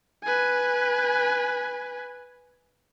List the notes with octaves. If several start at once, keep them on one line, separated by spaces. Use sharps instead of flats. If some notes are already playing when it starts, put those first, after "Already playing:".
B4 G#5